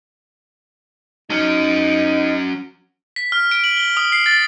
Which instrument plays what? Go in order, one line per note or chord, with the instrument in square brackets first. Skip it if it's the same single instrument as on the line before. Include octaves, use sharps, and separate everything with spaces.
[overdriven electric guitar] F#3 C#4 [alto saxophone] D#4
[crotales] B6
F6
D7
F#7
G7
D#6
C7
A6